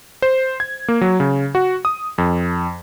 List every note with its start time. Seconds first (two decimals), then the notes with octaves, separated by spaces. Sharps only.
0.22 C5
0.60 G#6
0.88 A#3
1.01 F#3
1.20 C#3
1.55 F#4
1.85 D#6
2.18 F2